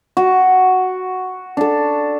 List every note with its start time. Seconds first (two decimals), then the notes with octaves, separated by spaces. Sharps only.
0.17 F#4
1.57 D4 A4